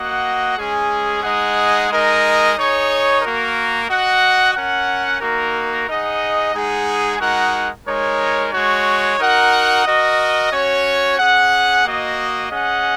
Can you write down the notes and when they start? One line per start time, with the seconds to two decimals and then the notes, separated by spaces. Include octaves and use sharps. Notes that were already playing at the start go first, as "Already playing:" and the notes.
Already playing: A#3 F#4 D#5 F#5
0.56 G#3 C#4 G#4
1.22 G#3 D#4 G#4 D#5 F#5
1.89 G#3 D#4 A#4 D#5
2.56 D#4 G#4 C#5
3.21 A#3 F#4 A#4
3.88 F#4 D#5 F#5
4.54 C#4 A#4 F#5
5.20 A#3 D#4 F#4 A#4
5.87 D#4 G#4 D#5 F#5
6.53 G#3 D#4 G#4 F#5
7.19 G#3 D#4 F#4 A#4 F#5
7.86 G#3 D#4 A#4 C#5
8.52 G#3 F#4 C#5
9.18 D#4 F#4 A#4 F#5
9.85 F#4 A#4 D#5
10.51 C#4 F#4 C#5
11.18 C#4 G#4 F#5
11.83 A#3 F#4 D#5
12.50 C#4 G#4 D#5 F#5